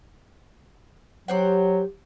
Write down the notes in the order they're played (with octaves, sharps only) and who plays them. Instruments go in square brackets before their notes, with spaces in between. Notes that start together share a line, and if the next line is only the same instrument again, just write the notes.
[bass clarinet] F#3 [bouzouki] G4 C5 F#5